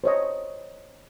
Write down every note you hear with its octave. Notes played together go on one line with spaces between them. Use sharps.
C5 C#5 D#5